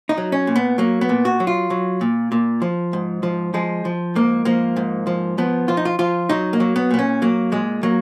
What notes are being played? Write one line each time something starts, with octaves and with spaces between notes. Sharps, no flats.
D#4
F#3
C#4
A#2
B3
F#3 A#3
B3
A#2
F#4
F#3
F4
F#3
A#2
A#2
F3
G#2
F3
F3 G#3
F3
G#2 A#3
F3 A#3
G#2
F3
F3 B3
F3 F4
D#4
F4
F3 F4
F#3 D#4
A#3
F#3
B3
A#2 B3
C#4
F#3 A#3
A#2 G#3
F#3 A#3